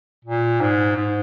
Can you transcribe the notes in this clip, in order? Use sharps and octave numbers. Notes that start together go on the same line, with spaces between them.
A#2
G#2
G#2